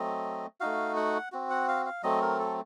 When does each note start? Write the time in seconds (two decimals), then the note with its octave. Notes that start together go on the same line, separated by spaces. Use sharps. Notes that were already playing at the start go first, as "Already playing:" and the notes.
Already playing: F#3 A3 C4 D#5
0.60 A3 D#4 F#4 F5
0.96 F#5
1.32 C4 F#4
1.50 F#5
1.68 F5
1.86 F5
2.03 F#3 A3 C4 D#5
2.22 A#4
2.39 A4